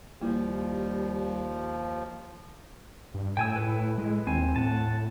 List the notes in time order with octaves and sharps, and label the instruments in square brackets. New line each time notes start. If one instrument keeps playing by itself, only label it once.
[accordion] D#2 F3 [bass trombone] G3 [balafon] A#3 E4
[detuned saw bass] G2
[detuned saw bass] A2 [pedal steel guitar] G5 G#5 E6
[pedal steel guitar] E4 A4 B4
[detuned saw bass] G#3
[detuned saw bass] D#2 [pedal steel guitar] C4 G#5
[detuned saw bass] A2 [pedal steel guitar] F#5 A5